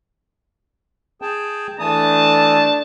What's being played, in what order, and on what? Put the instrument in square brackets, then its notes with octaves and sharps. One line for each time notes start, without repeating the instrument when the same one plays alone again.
[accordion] G#4 G5 A5
[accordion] E3 D#6 [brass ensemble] A3 D4 A5